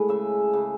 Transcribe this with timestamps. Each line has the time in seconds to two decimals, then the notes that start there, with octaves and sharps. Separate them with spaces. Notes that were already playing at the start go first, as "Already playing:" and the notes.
Already playing: A2 G#3 A4 B4
0.08 C#3 E5
0.53 C#3